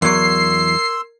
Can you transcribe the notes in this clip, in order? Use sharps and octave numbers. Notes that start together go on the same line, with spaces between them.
E2 F#3 A#4 C6 E6 G#6 C7